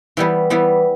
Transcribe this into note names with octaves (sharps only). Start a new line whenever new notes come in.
E3 G3 B3
E3 G3 B3